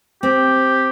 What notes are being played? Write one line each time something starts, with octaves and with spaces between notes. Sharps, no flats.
C4 G4